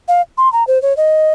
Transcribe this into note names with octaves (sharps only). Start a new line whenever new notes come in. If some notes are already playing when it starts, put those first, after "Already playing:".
F5
C6
A#5
C5
C#5
D#5